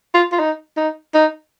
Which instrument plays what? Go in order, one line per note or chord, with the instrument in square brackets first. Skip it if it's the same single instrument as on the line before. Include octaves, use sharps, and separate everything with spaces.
[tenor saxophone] F4
F4
D#4
D#4
D#4